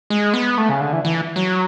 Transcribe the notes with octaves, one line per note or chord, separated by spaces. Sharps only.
G#3
B3
A3
C#3
D3
E3
E3
F#3